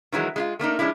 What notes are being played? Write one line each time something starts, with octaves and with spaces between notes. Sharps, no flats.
D#3 E3 F#3 G#3
G#3 E4 F4
A3 A#3 D4 D#4
F3 G#3 C#4 D4 E4